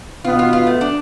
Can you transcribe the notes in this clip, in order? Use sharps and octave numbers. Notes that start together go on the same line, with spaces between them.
B2 B3 F4
F4
F4
A3
D4